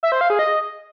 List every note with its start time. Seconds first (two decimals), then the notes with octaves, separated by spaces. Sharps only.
0.03 E5
0.12 C5
0.21 F5
0.30 G#4
0.39 D#5